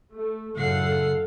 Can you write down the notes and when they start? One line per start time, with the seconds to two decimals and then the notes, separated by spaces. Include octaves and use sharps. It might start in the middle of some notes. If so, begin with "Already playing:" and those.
0.13 A3
0.57 F#2 A2 C#3 A4 F5 F#5 C7